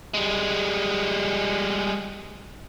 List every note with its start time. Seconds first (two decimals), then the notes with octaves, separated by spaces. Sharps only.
0.14 G3 G#3